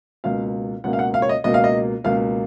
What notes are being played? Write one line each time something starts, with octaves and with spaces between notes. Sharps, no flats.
C#2 B2 A#3 F5
C#2 B2 A#3 F#5
F5
F#5
F5
C#5
D#5
C#2 B2 A#3 D#5
F5
D#5
C#2 B2 A#3 F5